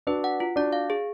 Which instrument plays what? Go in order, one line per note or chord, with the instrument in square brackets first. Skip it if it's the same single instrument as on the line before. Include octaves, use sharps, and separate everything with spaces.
[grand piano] D4 F#4 [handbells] B4
[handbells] F#5
F4
[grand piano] D4 F#4 [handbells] D5
[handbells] F5
G#4